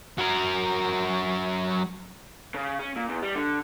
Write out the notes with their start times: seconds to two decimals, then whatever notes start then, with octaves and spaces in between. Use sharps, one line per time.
0.18 F#3 A#4
2.55 C#3
2.80 C#4
2.96 A#2
3.09 E2
3.23 G3
3.36 D3